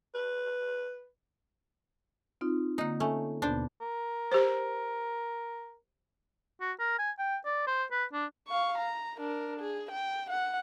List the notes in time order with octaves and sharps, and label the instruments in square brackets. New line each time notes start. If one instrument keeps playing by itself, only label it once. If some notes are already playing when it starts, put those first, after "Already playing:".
[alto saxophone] B4
[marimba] C4 D#4 F4
[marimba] D3 A#3 [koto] D#4 F#5
[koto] A3 C#4
[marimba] D#2 B2 B3 [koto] D4 C5
[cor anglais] A#4
[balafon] G4 C5
[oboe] F#4
A#4
G#5
G5
D5
C5
B4
D4
[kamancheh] F5 C#6
A#5
D4 A#4
G#4
G5
F#5